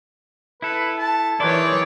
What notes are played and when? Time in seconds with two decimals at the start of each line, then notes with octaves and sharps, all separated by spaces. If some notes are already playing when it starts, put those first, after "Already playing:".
0.62 E4 A4 B4
0.98 A5
1.40 D#3 E3 E4 G#4 C#5 D5 C6 F#6